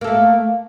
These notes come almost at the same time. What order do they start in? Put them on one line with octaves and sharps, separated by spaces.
A#3 A4 A3